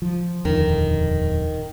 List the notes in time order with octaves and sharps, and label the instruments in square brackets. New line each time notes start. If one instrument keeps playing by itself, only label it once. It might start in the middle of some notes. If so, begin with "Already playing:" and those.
[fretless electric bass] F3
[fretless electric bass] D#1 F2 D3 [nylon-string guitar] D#3